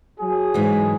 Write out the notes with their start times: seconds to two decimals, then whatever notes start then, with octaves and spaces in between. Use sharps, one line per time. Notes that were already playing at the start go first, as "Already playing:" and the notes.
0.20 F#3 F#4 G#4
0.54 G#2 E3